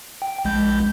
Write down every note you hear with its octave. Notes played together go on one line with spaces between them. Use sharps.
G5
A#1 G#3 G6